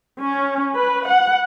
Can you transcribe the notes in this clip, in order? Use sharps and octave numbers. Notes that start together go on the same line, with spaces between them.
C#4
B4
F#5